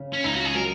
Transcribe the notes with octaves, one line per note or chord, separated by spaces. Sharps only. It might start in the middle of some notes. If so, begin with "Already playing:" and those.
Already playing: C#3
C#4
C#2 D#4
F#4
G#4
F#3 A#4